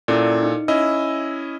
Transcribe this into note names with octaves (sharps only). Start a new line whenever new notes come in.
A#2 C#4 E4 A4 D5
D#4
C#4 E4 D#5 E6